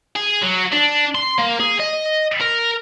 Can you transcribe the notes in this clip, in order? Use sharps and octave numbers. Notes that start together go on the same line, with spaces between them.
G#4
F#3
D4
C6
A#3
G#4
D#5
A#4